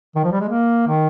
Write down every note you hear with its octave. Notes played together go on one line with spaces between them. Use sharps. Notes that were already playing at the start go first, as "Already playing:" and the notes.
D#3
F3
G3
G#3
A#3
D#3